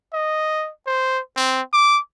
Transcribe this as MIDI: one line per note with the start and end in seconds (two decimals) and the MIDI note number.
0.14 0.70 75
0.87 1.20 72
1.36 1.62 60
1.73 1.99 86